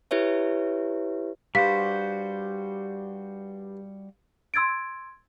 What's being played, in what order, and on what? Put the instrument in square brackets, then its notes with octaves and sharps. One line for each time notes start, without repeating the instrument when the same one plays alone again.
[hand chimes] E4 G4 B4 C#5 E5
[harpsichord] G2 [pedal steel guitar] G3 F#4 C5 [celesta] F5 B6
[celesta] C6 E6 G#6 A6 D7